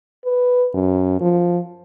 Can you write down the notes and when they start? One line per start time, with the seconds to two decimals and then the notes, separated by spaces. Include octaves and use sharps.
0.25 B4
0.74 F#2
1.21 F3